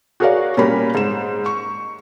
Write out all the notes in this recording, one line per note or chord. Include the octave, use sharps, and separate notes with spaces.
F#4 G#4 A#4 C#5 D5 F5
A#2 G3 C#4 A#4 B5
G#2 E7
C#6